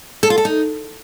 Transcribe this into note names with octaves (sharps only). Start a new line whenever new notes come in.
A4
F4
A4
D#4